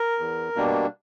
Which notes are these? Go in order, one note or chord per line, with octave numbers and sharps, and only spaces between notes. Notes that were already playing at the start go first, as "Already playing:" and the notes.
Already playing: A#4
E2
B2 G3 A#3 D4